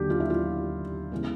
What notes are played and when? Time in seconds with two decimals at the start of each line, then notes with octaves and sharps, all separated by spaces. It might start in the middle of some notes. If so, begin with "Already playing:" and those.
Already playing: D#2 D3 F#3 G4
0.10 F4
0.20 E4
0.30 F4
1.12 C#3 E3 G#3 B3